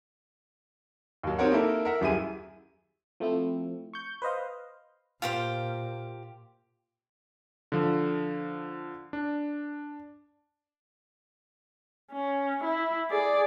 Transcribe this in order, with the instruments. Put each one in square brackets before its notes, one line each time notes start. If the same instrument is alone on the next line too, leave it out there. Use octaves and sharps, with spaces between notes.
[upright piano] D#2 F#3
C4 D#4 G4 A#4 C#5 F#5
A#3 D#4 E4 A4 A#4
A#4 E5 F#5
D#1 F#2 E4 G4 G#4 D#7
[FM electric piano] F3 A3 C4 E4
C#6 G6
B4 C5 D#5 F5
[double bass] A#2 [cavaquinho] F4 G4 C5
[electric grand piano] D3 F3
D4
[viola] C#4
E4
G#4 D5